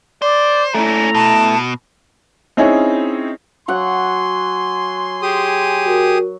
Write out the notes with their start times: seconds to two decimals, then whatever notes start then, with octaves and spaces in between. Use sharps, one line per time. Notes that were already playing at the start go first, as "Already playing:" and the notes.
0.22 C5 D5
0.74 A3 C#4 D4 E4 A#5
1.15 B2 A5
2.57 C4 C#4 D#4 E4 G#4 C#5
3.68 F#3 F#5 G#5 C6
5.22 G4 G#4 D#6
5.85 F#4 A#4